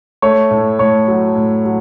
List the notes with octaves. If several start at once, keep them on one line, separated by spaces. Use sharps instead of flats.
A3 C#5
A2
A2 C#5
F#3
A2
F#3